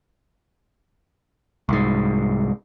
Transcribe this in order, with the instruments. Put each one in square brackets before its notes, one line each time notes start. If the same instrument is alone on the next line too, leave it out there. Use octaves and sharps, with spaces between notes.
[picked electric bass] C2 G#2